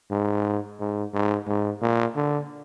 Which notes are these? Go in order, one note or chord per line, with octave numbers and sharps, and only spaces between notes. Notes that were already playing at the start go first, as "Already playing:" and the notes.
G#2
G#2
G#2
G#2
A#2
D3